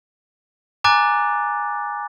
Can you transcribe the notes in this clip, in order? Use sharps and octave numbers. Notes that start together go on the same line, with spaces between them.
G#5 A#5 D6 F#6 A6